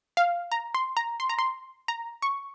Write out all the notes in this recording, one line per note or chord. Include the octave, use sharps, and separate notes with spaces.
F5
A#5
C6
A#5
C6
A#5
C6
A#5
C#6